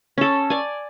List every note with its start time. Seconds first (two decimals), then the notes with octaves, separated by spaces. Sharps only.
0.18 C#4 A4
0.50 D5 G#5